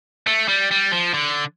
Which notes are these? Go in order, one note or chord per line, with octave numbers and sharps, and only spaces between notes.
A3
G3
G3
F3
D3